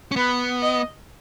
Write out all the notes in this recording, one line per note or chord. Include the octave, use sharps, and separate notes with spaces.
C#4
B3 B4
D#5